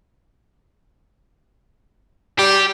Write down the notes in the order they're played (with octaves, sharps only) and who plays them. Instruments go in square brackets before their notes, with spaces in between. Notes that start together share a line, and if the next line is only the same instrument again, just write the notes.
[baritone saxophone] G3 [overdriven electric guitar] G4